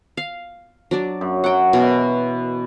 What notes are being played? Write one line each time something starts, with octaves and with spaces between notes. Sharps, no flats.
F5
F#3 D4 D5
F#2
F#3 F#5 G5
B2 E3 A#4